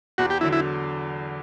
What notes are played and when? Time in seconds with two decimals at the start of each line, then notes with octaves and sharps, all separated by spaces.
0.18 E2 F#4
0.30 G4
0.41 D3 F#3 E4
0.53 E4